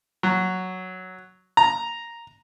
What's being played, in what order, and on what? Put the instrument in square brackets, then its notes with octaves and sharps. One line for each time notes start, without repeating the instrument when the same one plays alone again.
[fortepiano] F#3
A#5